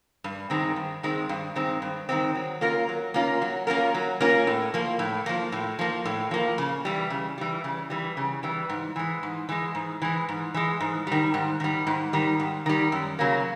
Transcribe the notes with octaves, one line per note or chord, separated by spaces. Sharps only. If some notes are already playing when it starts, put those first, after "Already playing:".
G2
D#3 G#3 C4
G2
D#3 G#3 C4
G2
D#3 G#3 C4
G2
D#3 G#3 C4
F#3
A#3 C#4 F4 A#4
F#3
A#3 C#4 F4 A#4
F#3
A#3 C#4 F4 A#4
F#3
A#3 C#4 F4 A#4
A2
F3 A#3
A2
F3 A#3
A2
F3 A#3
A2
F3 A#3
C#3
E3 G3
C#3
E3 G3
C#3
E3 G3
C#3
E3 G3
G#2
E3 G#3
G#2
E3 G#3
G#2
E3 G#3
G#2
E3 G#3
G#2
D#3 G3
G#2
D#3 G3
G#2
D#3 G3
G#2
D#3 G3
F#2
C#3 F#3 A#3